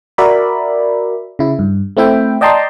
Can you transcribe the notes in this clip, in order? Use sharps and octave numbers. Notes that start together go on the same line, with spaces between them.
F#4 A#4 D5 E5 B5
C#3 E4
G2
A3 C4 E4 E5 G5
D5 D#5 G5 A5 A#5 C6